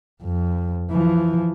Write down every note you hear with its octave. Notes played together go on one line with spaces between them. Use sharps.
F2
E3 F3